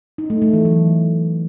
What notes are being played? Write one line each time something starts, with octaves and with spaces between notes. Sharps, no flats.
D#4
A3
A3
E3
F#3